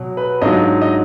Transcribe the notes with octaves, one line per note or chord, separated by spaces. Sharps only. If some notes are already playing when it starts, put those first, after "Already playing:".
Already playing: B2 F#3
B4
G#2 F#3 D4 F4 D#5
D#5